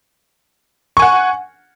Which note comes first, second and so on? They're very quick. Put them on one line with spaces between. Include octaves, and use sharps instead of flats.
C#6 G#5 F#5